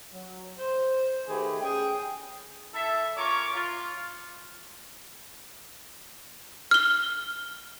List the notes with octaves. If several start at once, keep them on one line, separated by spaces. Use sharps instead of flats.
F#3
C5
D#3 A3 G4 G#4 B4
C#4 G#4 G5
E4 A4 E5
C#4 F4 A#4 C#5 C#6 D6
F4
F6 G7